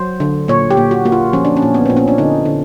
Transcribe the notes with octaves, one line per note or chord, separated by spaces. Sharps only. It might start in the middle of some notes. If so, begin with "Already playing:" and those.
Already playing: F#3 C5
D3
A#2 C#5
G4
A#2
F#4
A#3 F#4
F4
F3 C#4
D4
C#4
A#2
B3
A#2 C4
C#4
D4
D3 D#4
D3